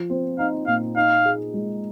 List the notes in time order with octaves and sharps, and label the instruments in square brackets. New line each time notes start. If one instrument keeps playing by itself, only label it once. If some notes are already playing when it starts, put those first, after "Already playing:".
Already playing: [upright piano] F3
C4
[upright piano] D#4 [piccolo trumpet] F5
[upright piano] A#2 [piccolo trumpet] F5
[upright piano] D#4 [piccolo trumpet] F5
[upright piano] G#4
G#3